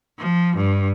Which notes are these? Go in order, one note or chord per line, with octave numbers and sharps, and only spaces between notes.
F3
G2